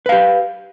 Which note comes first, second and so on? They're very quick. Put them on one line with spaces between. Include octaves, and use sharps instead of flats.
B4 F5 G4